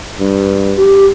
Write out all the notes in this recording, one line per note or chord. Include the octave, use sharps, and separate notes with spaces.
G2
G4